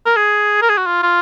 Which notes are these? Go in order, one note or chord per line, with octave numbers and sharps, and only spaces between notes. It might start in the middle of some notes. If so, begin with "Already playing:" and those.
A#4
G#4
A#4
G#4
F#4
F4
F4